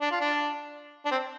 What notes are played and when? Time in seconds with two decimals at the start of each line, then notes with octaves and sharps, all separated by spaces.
0.01 D4
0.11 F4
0.21 D4
1.06 D4
1.11 C4